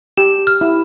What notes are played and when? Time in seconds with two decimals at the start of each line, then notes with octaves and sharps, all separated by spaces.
0.17 G4 E7
0.47 F6
0.61 E4